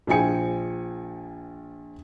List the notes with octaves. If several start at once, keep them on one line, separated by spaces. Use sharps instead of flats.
A#1 F3 G5 G#5 C#7